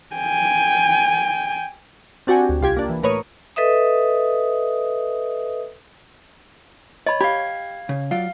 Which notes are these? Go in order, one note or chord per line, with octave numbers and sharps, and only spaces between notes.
G5 G#5
C4 D4 F#4 G4 G5 G#5
D2
C2 F4 G4 G#6
A#3 D4
E3
A2 A#4 B4 C#5 D#6 C#7
A4 B4 D#5 E5 D#6
C#5 D#5 B5
G4 F5 B5 G#6
C#3
F#3 F4 D5 F5